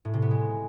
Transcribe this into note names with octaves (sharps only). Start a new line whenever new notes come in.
A2
C3
B3
G#3